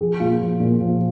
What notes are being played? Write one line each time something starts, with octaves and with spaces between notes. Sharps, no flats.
F3 G#4
A#2 F4
F3
A#2
F3